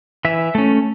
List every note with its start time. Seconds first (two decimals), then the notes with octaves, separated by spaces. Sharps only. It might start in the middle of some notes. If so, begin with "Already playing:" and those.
0.25 E3 E5
0.55 A3 C#4